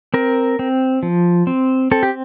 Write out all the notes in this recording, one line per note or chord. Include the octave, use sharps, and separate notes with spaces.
C4 A#4
C4
F3
C4
C4 A4
G4